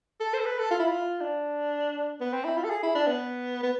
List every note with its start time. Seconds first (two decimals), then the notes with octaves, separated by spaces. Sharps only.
0.21 A4
0.34 C5
0.40 A4
0.46 B4
0.59 A4
0.71 F4
0.79 E4
0.88 F4
1.21 D4
2.21 B3
2.33 C4
2.45 E4
2.57 F4
2.64 A4
2.70 G#4
2.83 E4
2.95 D4
3.07 B3
3.63 B3